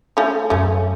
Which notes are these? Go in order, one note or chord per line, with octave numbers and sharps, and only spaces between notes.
A3 C#4
F#2 A3 C#4